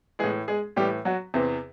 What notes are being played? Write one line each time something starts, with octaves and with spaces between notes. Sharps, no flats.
A2 E3 G#3 G#4
G#3 G#4
A2 E3 G3 G4
F#3 F#4
E2 C3 E3 C4